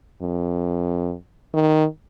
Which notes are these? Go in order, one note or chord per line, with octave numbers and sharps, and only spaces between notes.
F2
D#3